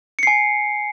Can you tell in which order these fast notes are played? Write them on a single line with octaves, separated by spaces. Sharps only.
C#7 C7 G#5